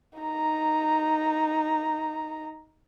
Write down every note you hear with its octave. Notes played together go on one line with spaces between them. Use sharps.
D#4 A#5